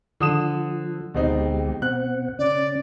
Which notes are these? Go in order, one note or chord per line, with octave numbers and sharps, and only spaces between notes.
D3 F3 D#6 E7
D2 B2 G#3 C4 D#4 G4
B2 C4 F#5 F#6
C#3 C#4 D5